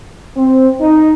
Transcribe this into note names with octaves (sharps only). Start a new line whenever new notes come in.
C4
D#4